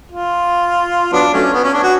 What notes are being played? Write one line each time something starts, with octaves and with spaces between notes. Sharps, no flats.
F4
F#3 B3 D4
F#3 A3 C#4
B3
C#4
D4
F#4